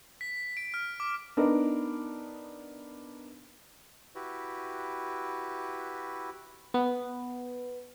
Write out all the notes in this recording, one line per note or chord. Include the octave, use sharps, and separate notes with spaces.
B6
D7
F6
D6
B3 D4 D#4 A#4
E4 F#4 G4 B4
B3